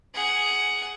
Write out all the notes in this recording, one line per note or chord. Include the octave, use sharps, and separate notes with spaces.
G#4 F#5